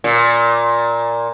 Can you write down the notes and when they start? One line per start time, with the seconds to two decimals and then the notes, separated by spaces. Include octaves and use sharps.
0.04 A#2